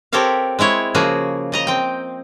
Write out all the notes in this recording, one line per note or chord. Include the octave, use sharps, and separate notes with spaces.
C4 G4 A4 A#4 C#5 F5
G#3 C4 E4 C#5
C#3 F3 A#3 F#4 G#4
C#3 D#5 A#5
C4 G5